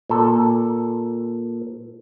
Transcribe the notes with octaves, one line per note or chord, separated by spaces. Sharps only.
A#2 A4